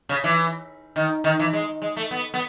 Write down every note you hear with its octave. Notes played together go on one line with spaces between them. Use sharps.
C#3
E3
D#3
D#3
E3
G#3
G#3
A3
B3
B3